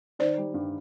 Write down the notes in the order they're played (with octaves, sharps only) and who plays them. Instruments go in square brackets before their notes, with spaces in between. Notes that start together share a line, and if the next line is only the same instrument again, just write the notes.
[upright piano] D#3 [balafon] C5 D5
[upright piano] G3
G2